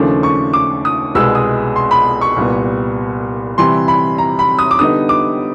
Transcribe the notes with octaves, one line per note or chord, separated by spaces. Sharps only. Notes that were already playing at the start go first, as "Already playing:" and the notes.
Already playing: D#2 C#3 F3 A3 D4
C#6
D6
D#6
C2 B2 G#3 B3 E6
D#6
C6
B5
C#6
C2 A#2 G3 B3
C3 E3 G3 C6
B5
A#5
B5
D#6
D6
D3 G3 B3 D#4 D#6
D6